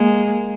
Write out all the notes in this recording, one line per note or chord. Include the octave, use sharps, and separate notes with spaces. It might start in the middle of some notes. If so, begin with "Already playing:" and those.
Already playing: G#3 A#3